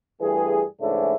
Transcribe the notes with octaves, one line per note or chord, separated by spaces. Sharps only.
G2 E3 G3 A3 G#4
G#2 C#3 E3 A3 D4 E4